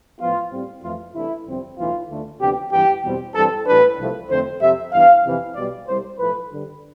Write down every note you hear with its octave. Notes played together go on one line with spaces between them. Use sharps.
A2 F3 B3 F4
A2 G3 C4
F2 E3 A3 F4
C2 C3 E3 A3 D4 E4
G1 F2 C3 G3 C4
B1 A2 E3 F4
D2 D3 A3 D4
D2 C3 F3 B3 D4 G4
G2 E3 B3 G4
E2 B2 G3 C4
G2 E3 G3 C4 A4
A2 E3 G3 D4 B4
C2 C3 F3 A3
F2 D3 A3 C4 C5
F2 C3 G3 E5
G2 E3 B3 D4 F5
F2 C3 E3
B1 B2 G3 D5
C2 C3 G3 C5
B1 A2 F3 A3 B4
G2 D3 G3